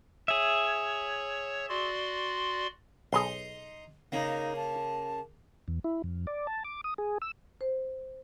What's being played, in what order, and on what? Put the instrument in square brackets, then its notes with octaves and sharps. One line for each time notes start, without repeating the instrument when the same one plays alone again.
[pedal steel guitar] G#4 E5 [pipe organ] C#5
[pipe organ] F#4 D5 C6
[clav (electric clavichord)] B1 G#4 [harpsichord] D#4 C6
[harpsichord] C#3 A#3 [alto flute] D#4
[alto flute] A5
[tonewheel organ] E2
E4
F2
D5
A5
D6
D#6
G#4
E6
[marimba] C5